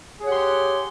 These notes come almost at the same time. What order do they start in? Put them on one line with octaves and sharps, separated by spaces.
G#4 C#5 F#5 G4 C6